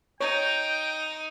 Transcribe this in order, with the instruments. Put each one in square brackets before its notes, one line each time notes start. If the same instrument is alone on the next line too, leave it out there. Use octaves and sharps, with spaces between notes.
[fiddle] D#4 [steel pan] C#5 [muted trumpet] G5